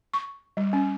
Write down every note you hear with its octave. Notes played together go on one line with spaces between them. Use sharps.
C#6
G3
C#4